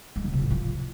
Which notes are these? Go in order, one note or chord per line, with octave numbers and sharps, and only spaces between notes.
G#3
C#3
C3
A2
F3